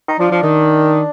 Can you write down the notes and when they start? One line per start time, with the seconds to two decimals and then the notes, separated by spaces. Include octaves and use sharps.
0.08 D#4
0.19 F3 D4
0.31 F3
0.43 D#3